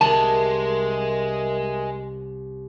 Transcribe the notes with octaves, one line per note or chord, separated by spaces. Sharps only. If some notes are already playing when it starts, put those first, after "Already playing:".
C2 G#3 A#4 E5 A5